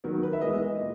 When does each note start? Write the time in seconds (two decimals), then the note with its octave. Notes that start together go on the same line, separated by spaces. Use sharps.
0.04 D#3 F#3 B3 A#4
0.23 B4
0.33 E5
0.41 E3 G#3 B3 D#5
0.79 A#2